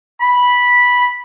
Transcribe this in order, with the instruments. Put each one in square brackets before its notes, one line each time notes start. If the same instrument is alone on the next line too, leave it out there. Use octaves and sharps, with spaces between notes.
[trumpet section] B5